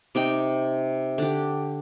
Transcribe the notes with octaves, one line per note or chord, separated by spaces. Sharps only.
C3 D#4 G5
D3 G4